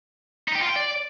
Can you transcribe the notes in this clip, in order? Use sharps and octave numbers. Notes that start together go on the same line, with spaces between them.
D#4
G4
F4
G5
D5